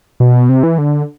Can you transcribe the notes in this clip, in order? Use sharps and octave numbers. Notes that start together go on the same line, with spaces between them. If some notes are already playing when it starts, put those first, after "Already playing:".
B2
C3
E3
D3